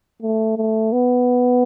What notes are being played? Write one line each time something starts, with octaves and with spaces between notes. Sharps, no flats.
A3
A3
B3